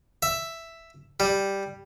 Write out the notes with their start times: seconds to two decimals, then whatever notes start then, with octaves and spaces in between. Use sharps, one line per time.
0.22 E5
1.20 G3